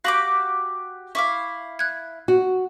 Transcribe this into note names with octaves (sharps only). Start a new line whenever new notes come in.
F#4 G4 F5 D6 A#6 F#7
E4 F5 C#6 D6 B6
F#6 G#6
F#4